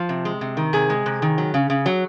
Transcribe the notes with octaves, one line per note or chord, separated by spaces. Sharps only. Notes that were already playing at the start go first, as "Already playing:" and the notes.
Already playing: F3
C3
G#3
C3
D#3
C3 G#4
G#3
C3
D#3
F#3
C#3
C#3
F#3